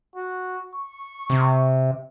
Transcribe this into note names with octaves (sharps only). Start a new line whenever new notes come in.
F#4
C#6
C3